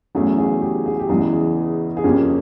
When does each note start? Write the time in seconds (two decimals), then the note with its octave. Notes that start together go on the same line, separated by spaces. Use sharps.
0.15 E2 C#3 F#3 A3 C#4 G#4
0.38 G#4
0.61 G4
0.86 G#4
0.99 G4
1.09 E2 C#3 E3 G#3 G#4
1.97 G#4
2.04 F2 C#3 F3 A#3 C#4 G4